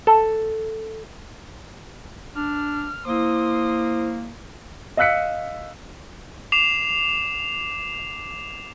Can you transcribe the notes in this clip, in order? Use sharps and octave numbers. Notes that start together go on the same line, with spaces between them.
A4
D4 F6
A#3 E4 C5 C6 D#6
D#5 F5 E6 F#6 B6 C#7
D6 C7 E7 F7